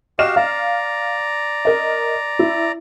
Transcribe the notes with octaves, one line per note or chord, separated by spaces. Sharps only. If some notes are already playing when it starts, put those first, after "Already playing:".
F#4 G4 D#5 F5 F6 E7
D5 F5 A#5
A#4 D#5
E4